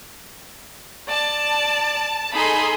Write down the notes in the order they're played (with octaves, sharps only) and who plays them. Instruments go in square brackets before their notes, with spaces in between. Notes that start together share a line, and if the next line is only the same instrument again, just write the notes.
[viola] D5 [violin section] A5
[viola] D#4 B5 [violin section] G#4 A4 C6